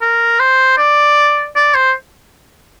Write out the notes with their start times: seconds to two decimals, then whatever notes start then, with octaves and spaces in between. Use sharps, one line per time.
0.01 A#4
0.40 C5
0.78 D5
1.56 D5
1.75 C5